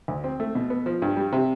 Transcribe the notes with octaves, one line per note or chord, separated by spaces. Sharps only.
D2
C4
A3
B2
B3
F3
G2
G3
C3